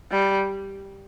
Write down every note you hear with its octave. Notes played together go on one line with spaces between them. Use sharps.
G3